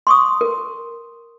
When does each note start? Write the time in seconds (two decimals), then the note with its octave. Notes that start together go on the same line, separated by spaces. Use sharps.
0.07 C6 C#6 D#6
0.41 A#4